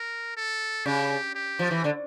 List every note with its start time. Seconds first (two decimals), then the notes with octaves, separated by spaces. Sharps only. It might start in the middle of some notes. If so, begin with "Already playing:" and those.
Already playing: A#4
0.37 A4
0.85 C#3 G4
1.35 G4
1.59 F3
1.71 E3
1.84 D3